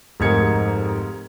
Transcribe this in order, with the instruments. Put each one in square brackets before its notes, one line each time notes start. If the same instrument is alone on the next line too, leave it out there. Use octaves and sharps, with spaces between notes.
[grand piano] F1 G#2 A#4 G#6 C#7